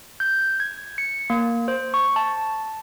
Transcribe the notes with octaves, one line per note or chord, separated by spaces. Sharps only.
G6
G#6
C#7
A#3
C5
C#6
A5